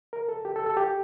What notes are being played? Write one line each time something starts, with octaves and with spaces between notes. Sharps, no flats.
A#4
A4
G4
A4
A4
G4